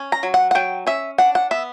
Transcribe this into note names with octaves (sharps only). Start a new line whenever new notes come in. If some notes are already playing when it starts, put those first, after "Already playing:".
Already playing: C#4
A#5
F#3
F#5
F#5
F#3 G5
C#4 E5
D4 F#5
F#5
B3 E5